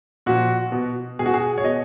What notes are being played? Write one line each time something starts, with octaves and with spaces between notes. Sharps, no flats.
A#2 F3 F#4
B2
B2 G#4
F#4
G#4
C#5
B2 D#5